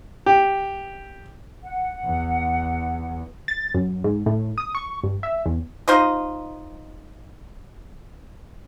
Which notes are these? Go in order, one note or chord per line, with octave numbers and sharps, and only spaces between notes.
G4
F#5
E2
A6
F#2
G#2
A2
D#6
C#6
G2
E5
E2
D#4 F4 C5 D#5